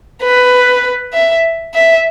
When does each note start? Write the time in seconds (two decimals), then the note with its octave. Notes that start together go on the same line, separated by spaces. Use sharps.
0.23 B4
1.14 E5
1.74 E5